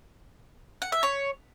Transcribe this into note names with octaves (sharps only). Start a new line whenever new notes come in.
F#5
E5
C#5